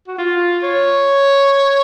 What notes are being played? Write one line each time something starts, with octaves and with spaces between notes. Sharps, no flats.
F#4
F4
C#5